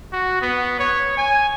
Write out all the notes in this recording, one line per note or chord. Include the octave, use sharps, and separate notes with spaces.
F#4
B3
C#5
G#5